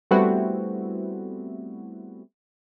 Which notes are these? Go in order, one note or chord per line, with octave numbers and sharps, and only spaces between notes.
G3 A3 B3 C4 E4 F#4